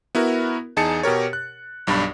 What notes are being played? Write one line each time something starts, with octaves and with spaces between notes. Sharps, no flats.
B3 E4 F#4 A#4
E2 D#4 G#4 A5 A6 C#7
B2 G4 A#4 C#5
F#6
B1 G2 D4 D5 B5